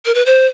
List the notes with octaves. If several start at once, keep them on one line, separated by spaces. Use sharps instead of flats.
A#4
B4
C5